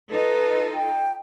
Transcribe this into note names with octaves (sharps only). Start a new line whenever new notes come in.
D#4 F4 A4 B4
G5